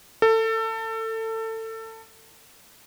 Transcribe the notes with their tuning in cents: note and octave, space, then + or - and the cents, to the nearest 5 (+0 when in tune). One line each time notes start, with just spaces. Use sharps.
A4 +25